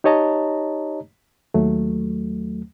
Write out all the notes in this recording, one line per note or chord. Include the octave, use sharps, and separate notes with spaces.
D#4 G4 C#5 D#5 A5 A#5
D#2 F#3 A3